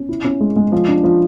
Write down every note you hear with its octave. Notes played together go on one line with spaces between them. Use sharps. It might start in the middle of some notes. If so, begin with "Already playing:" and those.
Already playing: C#4
E4
C#4
G#3
G#3
F3
D4
F3